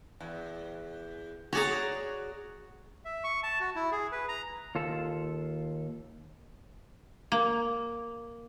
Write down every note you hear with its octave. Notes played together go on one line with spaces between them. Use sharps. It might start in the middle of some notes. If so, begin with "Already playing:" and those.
E2
F#4 G#4 C#5 D5 A#5
E5
C#6
A5
F#4
E4
G#4
B4
A#5
D#2 F4 A4
A#3